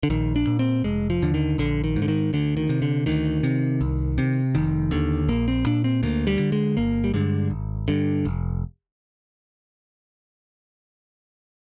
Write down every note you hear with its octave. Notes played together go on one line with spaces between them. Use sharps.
D3
A#1 D#3
D4
A#2
C4
F1 G#3
F3
D#2 D3
D#3
A#1 D3
D#3
G#2
D3
D#3
D2 D3
D#3
C3
D3
D2 D#3
C3
C2
C3
F1 D#3
D#2 D3
A#1 A#3
C4
A#2 D4
C4
D2 A#3
G3
D3
G#3
G1 A#3
G3
G2 D3 G#3
G#1
G2 D3
F1